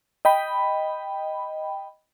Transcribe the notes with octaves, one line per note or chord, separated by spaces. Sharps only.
D#5 G5 B5